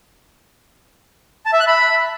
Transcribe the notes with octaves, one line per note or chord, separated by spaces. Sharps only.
A5
E5
F#6
B5